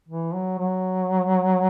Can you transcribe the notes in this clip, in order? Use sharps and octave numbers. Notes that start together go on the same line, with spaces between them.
E3
F#3
F#3